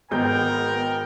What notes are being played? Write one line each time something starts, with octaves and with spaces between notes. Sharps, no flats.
G#1 G#3 B3 A#4 G5 A#5 G6